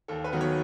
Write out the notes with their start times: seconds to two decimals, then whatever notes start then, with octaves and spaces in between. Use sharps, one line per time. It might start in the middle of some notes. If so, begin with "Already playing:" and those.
0.08 D#2 A4
0.24 B4
0.33 D#3 F#3 B3
0.41 C#5